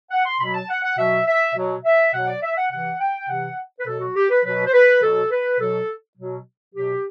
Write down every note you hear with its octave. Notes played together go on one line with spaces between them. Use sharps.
F#5
C6
B2 F#3 B5
A5
F#5
F#5
B2 F#3 E5
E5
B2 F#3
E5
B2 F#3 F#5
D5
E5
F#5
C3 E3 F#5
G5
C3 E3 F#5
B4
B2 F#3 A4
F#4
G4
B4
B2 F#3 B4
C5
B4
B2 F#3 A4
B4
B2 F#3 A4
B2 F#3
B2 F#3 G4